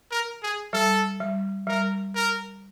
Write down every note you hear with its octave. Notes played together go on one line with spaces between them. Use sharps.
A#4
G#4
G3 A4
G3
G3 A#4
A#4